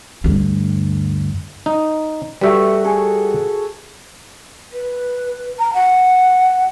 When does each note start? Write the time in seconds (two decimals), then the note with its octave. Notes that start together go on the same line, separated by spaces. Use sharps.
0.24 D2 G2
1.66 D#4
2.41 G3 A3 F#4 B4 E5
2.84 G#4 A4
4.73 B4
5.59 A#5
5.74 F#5